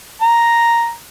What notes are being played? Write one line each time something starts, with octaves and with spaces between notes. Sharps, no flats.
A#5